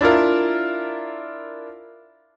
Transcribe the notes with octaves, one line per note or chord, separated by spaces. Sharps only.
D4 E4 F4 A#4